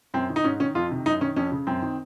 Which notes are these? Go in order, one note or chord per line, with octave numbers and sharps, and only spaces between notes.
F#2 C4
D#3
D#4
G#2 C#4
D#3 C#4
F2 F4
C3 D#3
F#2 D#4
D#3 C#4
F2 C#4
C#3
F#2 C4
D#3